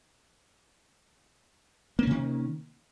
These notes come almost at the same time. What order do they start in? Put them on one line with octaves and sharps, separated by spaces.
A#3 C#4 C3 D#3